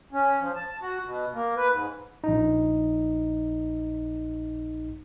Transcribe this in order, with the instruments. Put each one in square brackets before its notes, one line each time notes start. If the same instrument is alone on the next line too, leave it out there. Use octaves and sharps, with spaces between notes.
[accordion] C#4
F3
A5
F#4
B2
A#3
B4
G#2
[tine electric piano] A#1 D#4